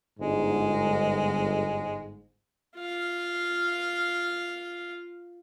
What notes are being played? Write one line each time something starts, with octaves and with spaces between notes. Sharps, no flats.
G1 G#2 G#3
F4 F5